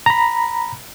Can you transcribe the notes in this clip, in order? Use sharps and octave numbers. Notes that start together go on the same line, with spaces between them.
A#5 B5